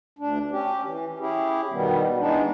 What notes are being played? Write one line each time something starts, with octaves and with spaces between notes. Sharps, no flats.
D2 D4
C#4 G4
E3
C#4 E4 G4 G#4
B2 D#3 G3 B3
E3 G#3 B3 D4 D#4